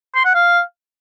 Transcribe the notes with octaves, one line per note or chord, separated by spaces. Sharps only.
C6
F#5
F5